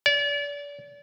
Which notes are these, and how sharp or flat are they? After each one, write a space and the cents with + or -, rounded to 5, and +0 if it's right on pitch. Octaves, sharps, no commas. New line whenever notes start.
D5 -35